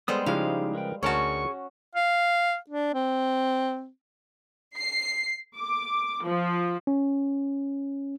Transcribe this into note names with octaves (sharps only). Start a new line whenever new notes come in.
G3 G#3 B3 G#4 A4 C5 D#6
C#3 F3 G#3 D#4 E4 G4 F5
A#4 B4 G5
D2 C#4 F#4 G#4 A#4 A5 C#6
F5
D4
C4
C7
D6
F3
C#4